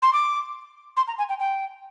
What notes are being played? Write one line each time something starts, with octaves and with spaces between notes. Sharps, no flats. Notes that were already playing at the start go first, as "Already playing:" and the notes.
C6
D6
C6
A#5
G#5
G5
G5